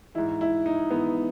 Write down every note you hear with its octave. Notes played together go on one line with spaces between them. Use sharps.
G#2 E3 E4
E4
D#4
G#2 E3 B3